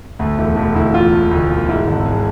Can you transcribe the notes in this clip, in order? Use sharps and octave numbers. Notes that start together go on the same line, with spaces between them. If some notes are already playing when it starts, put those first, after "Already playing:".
D2 A3
E1 E4
E1 A3
D2 E4
E1 F4
E1
D2
E1
G#2 E4
G#1
G#3